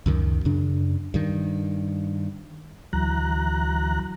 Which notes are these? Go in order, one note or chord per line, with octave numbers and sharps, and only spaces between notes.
C#2 F#2 D#3
F#2 C#3 D4
G2 D#3
D2 E3 F#3 A#5 F#6